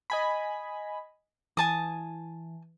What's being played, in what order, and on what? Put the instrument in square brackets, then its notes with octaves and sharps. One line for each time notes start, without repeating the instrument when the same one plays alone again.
[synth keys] D#5 G#5 B5
[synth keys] E3 [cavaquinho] G#5 A5 D#6